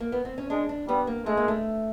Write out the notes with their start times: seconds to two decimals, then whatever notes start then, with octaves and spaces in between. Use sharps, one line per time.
0.00 A#3
0.12 B3
0.25 C4
0.38 C#4
0.50 G#3 D4
0.69 D4
0.88 G3 B3
1.07 A#3
1.26 G#3 A3
1.37 A#3
1.48 A3